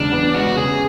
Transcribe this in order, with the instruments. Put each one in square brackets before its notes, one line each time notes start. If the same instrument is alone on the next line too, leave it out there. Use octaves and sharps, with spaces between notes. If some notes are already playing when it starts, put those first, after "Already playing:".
Already playing: [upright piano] E2 C#3 G#3 [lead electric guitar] D4
[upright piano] B3
[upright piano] G#3 [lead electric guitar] F#4
[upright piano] C#3 [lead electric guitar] G#4